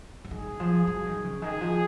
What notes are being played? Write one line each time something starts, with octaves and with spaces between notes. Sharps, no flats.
F3
D#3 G#4
F3
F#3
D#3
C#3
D#3 G#4
F3